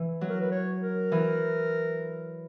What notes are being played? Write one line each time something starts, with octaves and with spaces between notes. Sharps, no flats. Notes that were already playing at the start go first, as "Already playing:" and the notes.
Already playing: E3
F#3
A#4
B4
C#5
A#4
E3